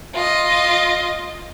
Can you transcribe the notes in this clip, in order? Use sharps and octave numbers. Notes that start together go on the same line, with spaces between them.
F4 D#5